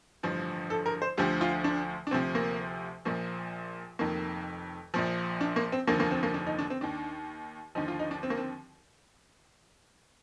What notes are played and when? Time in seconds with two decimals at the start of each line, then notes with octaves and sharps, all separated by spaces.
0.23 A1 G2 D3 F3
0.70 A4
0.86 A#4
1.02 C5
1.17 D2 D3 F3 G4
1.41 F4
1.64 D4
2.07 D4
2.11 D2 C3 F3 C4
2.35 A#3
3.05 A#1 A#2 F3 A#3
3.99 F1 F2 D#3 A#3
4.94 A#1 A#2 F3
5.41 D4
5.56 A#3
5.72 C4
5.87 F1 D#2 D3 F3 A#3
6.00 A#3
6.11 C4
6.23 A#3
6.34 D4
6.46 D#4
6.59 D4
6.70 C4
6.81 D#2 D#3 D4
7.75 D#2 D3 F3 D#4
7.88 F4
7.99 D#4
8.11 D4
8.23 C4
8.30 A#3
8.37 C4